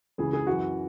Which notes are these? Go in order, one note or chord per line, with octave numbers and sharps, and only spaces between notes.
C#2 C#3 E3 G#4
G#4
F#2 E3 F#4